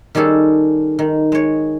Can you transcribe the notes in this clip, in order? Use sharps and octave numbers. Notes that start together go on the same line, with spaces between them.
D#3 G3 C#4 G#4 A4
D#3
G#3 C#5